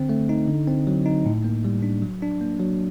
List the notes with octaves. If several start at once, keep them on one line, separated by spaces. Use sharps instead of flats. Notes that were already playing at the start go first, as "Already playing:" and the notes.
Already playing: D3 C4
A3
D#4
D3
C4
F#3
D#4
A2
A#3
G3
D4
F#3
D4
A#3
F#3